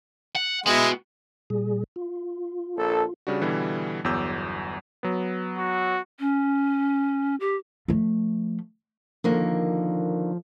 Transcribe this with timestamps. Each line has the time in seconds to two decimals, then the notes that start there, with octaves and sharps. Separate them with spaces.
0.35 F#5
0.66 G#3 B3 E4 F#4
1.50 A#2 G3 G#4
1.96 F4
2.77 A#1 A4
3.27 C#3 G3 D4 F#4
3.41 B2 D3 E3 G3
4.04 G1 E2 F#3 D6 E6 G6
5.03 F#3 B3
5.59 F#4
6.20 C#4
7.40 G4
7.88 F3 A3
9.24 D3 D#3 F3 A#3